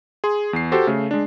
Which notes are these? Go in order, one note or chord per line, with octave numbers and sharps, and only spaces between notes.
G#4 C6
E2 C7
F#4 G4 A4 C5
C#3 A3
G#3 D4